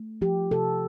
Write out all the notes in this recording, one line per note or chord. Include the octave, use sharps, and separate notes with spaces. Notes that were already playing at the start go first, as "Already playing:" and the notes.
Already playing: A3
F3 G4
C3 A4